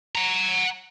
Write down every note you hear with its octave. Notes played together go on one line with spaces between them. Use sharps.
F#5 A#5